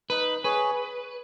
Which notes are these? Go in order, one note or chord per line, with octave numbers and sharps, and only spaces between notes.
D#4 B4
G#4 B4 C#5